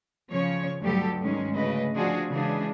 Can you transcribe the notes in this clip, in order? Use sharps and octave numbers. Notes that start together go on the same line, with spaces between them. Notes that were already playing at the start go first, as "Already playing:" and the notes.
C#3 F3 C#5
D2 G2 F#3 G3 G4 A4
G#2 D#3 G#3 C#4
D2 C#3 B4 D#5
F3 D4 F4 F#4 G#4
C#3 E3 G#3 D4 G#4